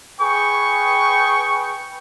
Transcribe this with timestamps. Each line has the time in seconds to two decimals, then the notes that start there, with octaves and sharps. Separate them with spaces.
0.21 G#4 B4 G5 C#6